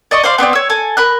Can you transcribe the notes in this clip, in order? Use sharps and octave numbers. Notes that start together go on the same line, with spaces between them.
D5 D#5 C#6
C5 D5 F5 C6
B3 C4 D5 G5
C#5 E6
A4 G#5
A#4 B5 F#6